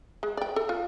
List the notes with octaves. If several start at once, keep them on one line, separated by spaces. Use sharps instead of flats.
G#3
D5 G5
A4
F4